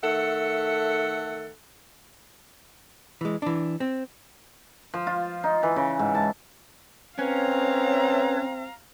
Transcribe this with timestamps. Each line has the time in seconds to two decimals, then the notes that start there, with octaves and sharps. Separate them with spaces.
0.03 D#3 A3 A4 E5 F#5
3.21 E3 G#3
3.42 E3 D4
3.80 C4
4.94 F3
5.07 F4
5.44 D#4
5.63 E3
5.76 C#3
5.99 G#2
6.15 A5
7.19 C4 C#4 B4 C#5 F5 A#5